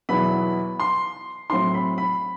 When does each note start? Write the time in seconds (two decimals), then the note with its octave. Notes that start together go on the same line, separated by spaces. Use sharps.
0.09 E2 B2 F#3 B3 E4 B5
0.80 C6
1.50 A2 F#3 C4 E4 C6
1.74 B5
1.98 B5